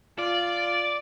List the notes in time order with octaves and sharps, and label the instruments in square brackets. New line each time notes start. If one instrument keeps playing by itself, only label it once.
[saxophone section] F3 F4 [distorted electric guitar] D5